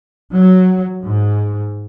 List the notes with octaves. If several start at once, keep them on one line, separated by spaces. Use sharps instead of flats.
F#3
G#2